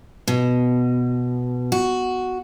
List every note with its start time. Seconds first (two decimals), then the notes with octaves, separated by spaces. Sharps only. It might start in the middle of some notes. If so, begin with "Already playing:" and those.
0.28 B2
1.72 F#4